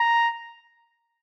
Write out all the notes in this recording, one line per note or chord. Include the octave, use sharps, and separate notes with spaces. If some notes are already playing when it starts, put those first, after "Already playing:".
Already playing: A#5